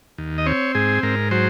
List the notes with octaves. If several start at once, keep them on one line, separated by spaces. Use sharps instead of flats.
D#2
D#5
C4 C#5
G#2 G#4
G#2 A#4
F#3 C5